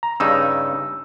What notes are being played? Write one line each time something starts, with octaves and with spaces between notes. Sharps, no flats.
A#5
G2 C#3 D#4 E6